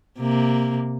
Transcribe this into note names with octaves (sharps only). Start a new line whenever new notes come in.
C3 A#3